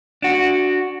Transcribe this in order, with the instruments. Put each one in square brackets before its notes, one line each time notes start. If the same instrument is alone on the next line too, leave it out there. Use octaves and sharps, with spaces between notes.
[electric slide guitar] D4 F#4